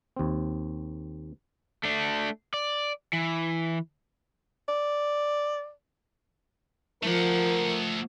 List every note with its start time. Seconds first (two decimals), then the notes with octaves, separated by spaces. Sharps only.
0.17 D#2 C4
1.83 A3 D4
2.54 D5
3.13 E3
4.68 D5
7.03 F3 A3 A#4 F#5